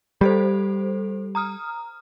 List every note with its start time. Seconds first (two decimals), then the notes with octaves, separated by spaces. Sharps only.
0.21 G3 G4 A4 C5
1.35 A#5 D#6 F6